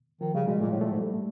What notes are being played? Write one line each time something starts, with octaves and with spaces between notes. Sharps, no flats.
D#3 F3
C#3 G3
B2 G#3
A#2 A3
A2
A#2 A3
G#2
G3
A3